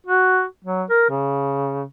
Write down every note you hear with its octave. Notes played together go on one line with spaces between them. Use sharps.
F#4
F#3
A#4
C#3